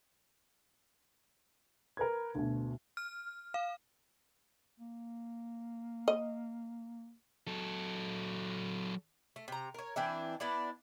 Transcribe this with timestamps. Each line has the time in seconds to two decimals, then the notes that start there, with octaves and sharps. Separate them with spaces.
1.97 A#4 B4 G#6
2.35 D2 B2
2.97 F6
3.54 F5
4.80 A#3
6.08 D#5
7.47 F#3 A4
9.36 A3
9.48 C3 A#5
9.74 A#4 C#5
9.96 E3 C4 D4 E5
10.40 B3 D4 E4 D5